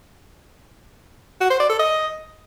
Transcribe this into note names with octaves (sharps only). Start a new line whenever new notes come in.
F#4
C5
D5
A4
D#5